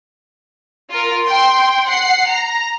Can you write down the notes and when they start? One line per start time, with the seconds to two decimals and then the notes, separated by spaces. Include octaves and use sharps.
0.90 F4 A#4
1.25 G5 C6
1.86 F#5 C7
2.28 A#5